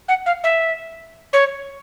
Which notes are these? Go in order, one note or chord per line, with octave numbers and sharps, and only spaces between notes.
F#5
F5
E5
C#5